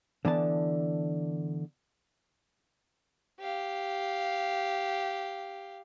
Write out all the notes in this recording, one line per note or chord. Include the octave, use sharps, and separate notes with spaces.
D3 E3 B3 A5
G4 F5